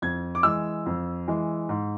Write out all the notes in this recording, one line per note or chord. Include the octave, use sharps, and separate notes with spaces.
F2 G#6
D6
E3 G#3 E6
F2
E3 G#3
G#2